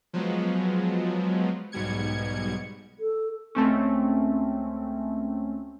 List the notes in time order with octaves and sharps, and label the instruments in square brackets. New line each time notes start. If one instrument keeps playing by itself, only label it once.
[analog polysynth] F3 F#3 G#3 B3
B1 G#2 B2 G3 G#6 C#7
[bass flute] A4
[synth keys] C#2 A3 C4 C#4